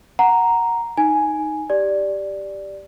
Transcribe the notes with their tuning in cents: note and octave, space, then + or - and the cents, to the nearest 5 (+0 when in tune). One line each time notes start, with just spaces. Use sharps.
F#5 +0 A#5 +0
D#4 +0 G#5 +5
G4 +0 D5 +0